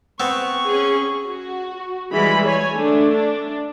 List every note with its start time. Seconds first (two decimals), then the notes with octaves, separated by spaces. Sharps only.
0.20 B3 C4 C#6
0.64 C#4 G#4
1.25 F#4
2.12 E3 G3 G#3 B5
2.45 C#5 G#5
2.74 A3 D4
3.12 D4